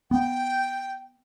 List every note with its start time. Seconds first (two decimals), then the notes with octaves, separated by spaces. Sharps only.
0.11 B3 G5